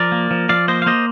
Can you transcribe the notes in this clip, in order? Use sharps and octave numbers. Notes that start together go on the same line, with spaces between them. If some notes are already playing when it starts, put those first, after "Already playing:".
Already playing: F3 A#4 D5
A#3
F3
F3 D5 F5
A#3 C5 D#5
F5
A#3 C5 D#5